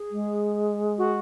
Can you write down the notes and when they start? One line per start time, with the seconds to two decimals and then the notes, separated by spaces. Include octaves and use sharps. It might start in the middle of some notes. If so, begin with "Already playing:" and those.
Already playing: G#4
0.11 G#3
0.98 F#4